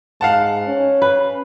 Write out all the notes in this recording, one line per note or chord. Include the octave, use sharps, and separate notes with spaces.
G#2 F5 F#5 A5
C#4
B4